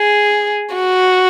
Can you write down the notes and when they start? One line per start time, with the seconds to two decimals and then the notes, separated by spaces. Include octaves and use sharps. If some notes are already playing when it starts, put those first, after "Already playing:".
Already playing: G#4
0.75 F#4